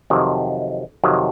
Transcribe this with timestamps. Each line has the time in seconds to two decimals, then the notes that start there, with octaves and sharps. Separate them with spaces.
0.10 F2 C3 D#3 F#3
1.03 F2 C3 D#3 F#3